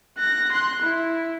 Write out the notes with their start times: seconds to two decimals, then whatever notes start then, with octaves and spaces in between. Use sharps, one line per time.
0.17 F#6 A#6
0.52 C6 F#6
0.82 E4